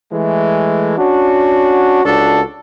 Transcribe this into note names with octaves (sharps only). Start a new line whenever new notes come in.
E3 G#3 A3
C#4 D4 F#4
C#2 D4 F#4 A4